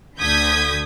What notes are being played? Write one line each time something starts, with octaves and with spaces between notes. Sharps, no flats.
D2 D3 D#6 G6 G#6 B6